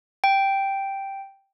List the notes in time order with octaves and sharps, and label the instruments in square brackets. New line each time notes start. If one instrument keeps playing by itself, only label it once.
[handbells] G5